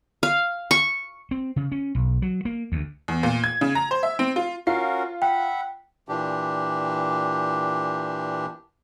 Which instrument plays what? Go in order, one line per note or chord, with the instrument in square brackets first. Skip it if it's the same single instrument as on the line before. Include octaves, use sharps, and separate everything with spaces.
[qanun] F5
C#6
[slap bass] C4
C#3
C#4
B1
F#3
A#3
D2
[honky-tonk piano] E2
A#2
G#6
C#3
A#5
C5
E5
C4
F4
[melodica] C#4 F#4 A#4 [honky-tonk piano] F4 C7
[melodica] E5 F#5 B5 [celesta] G5
[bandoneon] A#2 E3 D4 G4